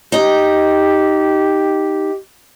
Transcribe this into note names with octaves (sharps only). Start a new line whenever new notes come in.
D#4 G4 D#5